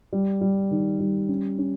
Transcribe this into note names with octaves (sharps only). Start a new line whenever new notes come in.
G3
G3
D#3
G3
C#4
C#4